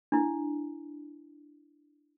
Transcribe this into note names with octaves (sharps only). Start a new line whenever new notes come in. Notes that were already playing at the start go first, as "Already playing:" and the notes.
D4 E4